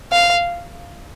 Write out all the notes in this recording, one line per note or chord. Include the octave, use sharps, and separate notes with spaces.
F5